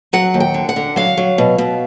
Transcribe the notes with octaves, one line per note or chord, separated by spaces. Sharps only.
F#3 F#5
D#2
G5
D3
F#5
D3
F#3 F5
F#3
B2
B2